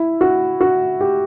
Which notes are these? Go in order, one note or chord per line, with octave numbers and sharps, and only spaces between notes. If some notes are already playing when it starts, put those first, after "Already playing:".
Already playing: E4
F#4
F#4
G4